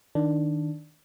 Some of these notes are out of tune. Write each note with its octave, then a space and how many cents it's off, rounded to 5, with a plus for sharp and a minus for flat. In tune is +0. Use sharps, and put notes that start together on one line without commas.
D#3 +0 D4 +0